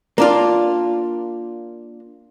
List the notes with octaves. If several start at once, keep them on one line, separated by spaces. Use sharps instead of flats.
A#3 D4 F4